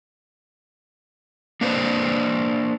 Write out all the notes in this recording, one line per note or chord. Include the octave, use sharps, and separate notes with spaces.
A#3 D4 B4 C5